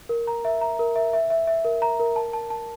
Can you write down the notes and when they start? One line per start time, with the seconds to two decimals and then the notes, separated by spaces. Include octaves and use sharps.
0.09 A#4
0.27 A#5
0.45 E5
0.61 A#5
0.79 A#4
0.96 E5
1.13 E5
1.30 E5
1.47 E5
1.65 A#4
1.82 A#5
2.00 A#4
2.16 A5
2.33 A5
2.50 A5